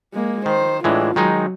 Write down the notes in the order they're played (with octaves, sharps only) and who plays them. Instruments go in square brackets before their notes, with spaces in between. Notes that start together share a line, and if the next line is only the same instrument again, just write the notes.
[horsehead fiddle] G#3 A#3
[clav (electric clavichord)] D#3 [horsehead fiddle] C5
[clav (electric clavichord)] A2 E3 G#3 [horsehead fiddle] D4 F4
[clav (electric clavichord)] D#3 G#3 D#4 [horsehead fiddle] F#3